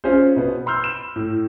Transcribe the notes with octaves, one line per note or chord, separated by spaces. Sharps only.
C#4 F4 G#4 C5
B2 B3
B5 C6 E6 F6 G6
E7
A2